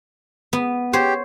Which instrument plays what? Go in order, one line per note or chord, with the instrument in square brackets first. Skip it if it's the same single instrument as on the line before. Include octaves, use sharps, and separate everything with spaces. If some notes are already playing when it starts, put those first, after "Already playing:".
[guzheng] B3
[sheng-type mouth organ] G4 [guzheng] C5 C#5